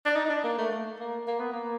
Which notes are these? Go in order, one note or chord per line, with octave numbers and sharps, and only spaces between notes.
D4
D#4
D#4
D4
A#3
A3
A3
A#3
A#3
B3
A#3